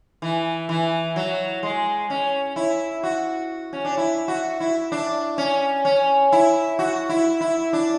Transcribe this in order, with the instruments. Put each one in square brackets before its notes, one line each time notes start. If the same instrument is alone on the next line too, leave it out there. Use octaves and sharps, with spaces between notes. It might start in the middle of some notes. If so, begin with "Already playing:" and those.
[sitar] E3
E3
F#3
G#3
C#4
E4
F#4
C#4
D4
E4
F#4
E4
D4
C#4
C#4
E4
F#4
E4
E4
D4